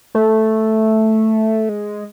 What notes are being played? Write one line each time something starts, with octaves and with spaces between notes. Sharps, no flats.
A3
G#3